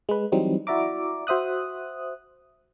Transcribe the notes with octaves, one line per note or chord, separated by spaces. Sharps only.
G#3 B4
E3 F#3 G3 C4 D#4
E4 F#4 D5 E5 A#5 D6
F#4 C5 E5 D#6 F#6